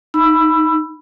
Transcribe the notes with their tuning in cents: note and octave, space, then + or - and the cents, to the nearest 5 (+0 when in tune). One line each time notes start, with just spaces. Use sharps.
D#4 +0 B5 +0 E6 +20